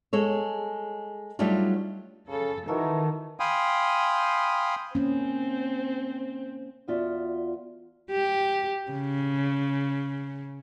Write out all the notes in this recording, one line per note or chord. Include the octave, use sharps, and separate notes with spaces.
G#3 A4 C#5
F#3 G3 A3 D4 D#4 F4
C#3 A4
D#3 E3 D#4 F#4 A4 A#4
F5 G5 G#5 B5 C6 D#6
A#3 C4 C#4
E2 B3 F4 F#4 D5 E5
G4
C#3